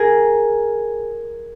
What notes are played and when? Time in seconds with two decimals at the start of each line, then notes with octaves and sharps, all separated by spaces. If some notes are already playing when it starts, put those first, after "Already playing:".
Already playing: G#4 A#4